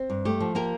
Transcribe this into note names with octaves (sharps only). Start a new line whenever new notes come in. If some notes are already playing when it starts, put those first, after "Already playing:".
Already playing: C4
G2
A3 G4
F3
A#3 G4 A#4